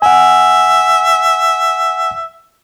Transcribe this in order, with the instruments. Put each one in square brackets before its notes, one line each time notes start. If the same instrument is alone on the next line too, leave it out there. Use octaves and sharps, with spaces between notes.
[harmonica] E5 [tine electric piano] F#5 G#5